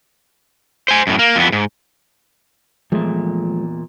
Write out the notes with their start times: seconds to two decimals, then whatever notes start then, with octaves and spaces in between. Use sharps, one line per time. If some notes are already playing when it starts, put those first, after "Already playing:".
0.88 C5 G#5
1.07 F#2 A2
1.19 A#3
1.36 F2 B3
1.52 G#2
2.92 E2 A#2 F3 G#3 A3